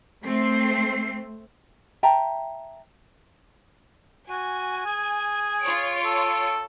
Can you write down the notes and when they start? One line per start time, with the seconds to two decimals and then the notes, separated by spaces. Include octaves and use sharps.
0.25 A3 C4 C7
2.03 E5 G5 A5 A#5
4.30 F#4 G#5
4.86 G#4
5.62 F4 C#5 D7
6.05 A4